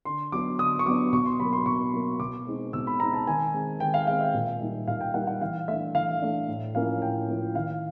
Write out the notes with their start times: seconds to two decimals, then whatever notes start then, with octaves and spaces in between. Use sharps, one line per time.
0.05 D3 C6
0.32 F#3 B3 D4 D6
0.59 D3 D#6
0.79 C#6
0.86 F#3 B3 D4 D6
1.13 B2 C#6
1.26 C6
1.39 F#3 A#3 B5
1.53 C6
1.66 B2 C#6
1.93 F#3 A#3
2.20 B2 D6
2.47 G#3 C4 D#4
2.73 B2 E6
2.87 B5
3.00 G#3 C4 D#4 A#5
3.14 A5
3.27 D#3 G#5
3.53 G#3 C4
3.80 D#3 G5
3.94 F5
4.07 G#3 C4 F5
4.20 E5
4.34 A#2
4.61 G3 A#3 D#4
4.88 A#2 F5
5.01 G5
5.14 G3 A#3 D#4 F#5
5.27 F#5
5.41 E3 F5
5.68 A3 D4 E5
5.95 E3 F5
6.22 A3 D4
6.48 A2
6.75 F3 A#3 C#4 E4 F5
7.02 A2 G5
7.28 F3 A#3 C#4 E4
7.55 D#3 F5